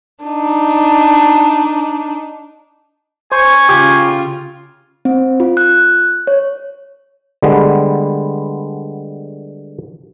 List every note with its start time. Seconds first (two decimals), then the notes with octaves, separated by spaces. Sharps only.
0.23 D4 D#4
3.32 C5 G#5 C#6
3.69 C#3 F4 G4
5.05 C4
5.40 F4
5.57 F#6
6.27 C#5
7.42 D3 G3 G#3 B3